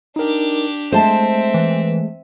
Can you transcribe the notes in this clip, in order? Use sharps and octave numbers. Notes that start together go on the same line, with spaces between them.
D4 D#4 G4 A#4
G#3 A3 C4 C5 E5 A5
E3